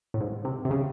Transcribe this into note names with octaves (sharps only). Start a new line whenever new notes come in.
A2
G#2
C3
C3
C#3